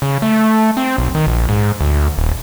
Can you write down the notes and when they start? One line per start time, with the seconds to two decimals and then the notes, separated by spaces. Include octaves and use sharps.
0.02 C#3
0.22 A3
0.77 C4
0.98 B1
1.15 D#3
1.27 A#1
1.49 G#2
1.81 D2
2.18 D#1